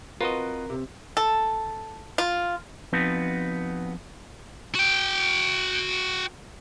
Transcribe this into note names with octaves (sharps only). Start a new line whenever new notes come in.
C4 F4 F#4 A#4 B4 D#5
C3
A4
F4
F3 B3 C4 D#4 F#4
F#4 G5